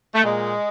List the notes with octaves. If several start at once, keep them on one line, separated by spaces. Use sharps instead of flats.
A3
A#2 G#3